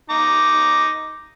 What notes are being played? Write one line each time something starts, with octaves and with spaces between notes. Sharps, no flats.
D#4 A#5 D6